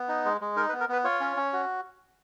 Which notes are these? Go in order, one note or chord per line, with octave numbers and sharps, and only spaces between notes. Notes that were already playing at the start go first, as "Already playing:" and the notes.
Already playing: B3
D#4
G#3
G#3
D#4 A#4
B4
B3
A#4
B3 B4
F4 C#5
C#4
C#4
F#4